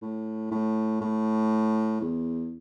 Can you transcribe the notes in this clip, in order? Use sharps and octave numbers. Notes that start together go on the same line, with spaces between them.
A2
A2
A2
E2